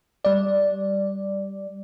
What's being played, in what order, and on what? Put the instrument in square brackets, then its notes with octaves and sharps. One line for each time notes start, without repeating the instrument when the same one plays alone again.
[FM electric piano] G3 D5